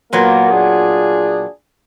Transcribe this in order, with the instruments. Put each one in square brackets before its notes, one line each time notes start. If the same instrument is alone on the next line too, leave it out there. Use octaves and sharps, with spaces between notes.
[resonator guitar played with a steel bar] A#2 F#3 B3 [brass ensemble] A#3 A#4
[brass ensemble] D4 F4 G#4